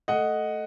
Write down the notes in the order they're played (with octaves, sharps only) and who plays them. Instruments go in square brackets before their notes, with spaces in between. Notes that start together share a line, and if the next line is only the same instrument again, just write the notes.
[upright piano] A3 D#5 F#5